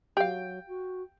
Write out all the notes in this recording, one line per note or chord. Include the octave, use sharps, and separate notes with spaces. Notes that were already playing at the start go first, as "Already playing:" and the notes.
F#3 G4 F5 G5
F#4